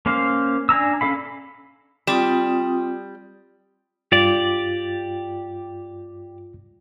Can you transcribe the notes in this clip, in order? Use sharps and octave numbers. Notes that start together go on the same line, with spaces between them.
A#3 C#4 C5 F5
D4 G#5 A#5 E6
C#4 A4 F5 B5
G3 C4 F4 D#6
G2 F4 G4 D5 A6